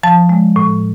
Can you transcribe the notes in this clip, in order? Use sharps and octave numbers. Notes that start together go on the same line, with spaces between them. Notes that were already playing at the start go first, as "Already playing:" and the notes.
F3 A5
G#3
A2